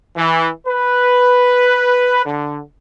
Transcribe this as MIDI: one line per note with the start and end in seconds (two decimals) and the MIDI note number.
0.16 0.49 52
0.67 2.25 71
2.26 2.58 50